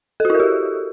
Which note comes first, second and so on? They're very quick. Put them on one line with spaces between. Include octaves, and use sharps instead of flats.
A4 F#4 E4 A#4 G4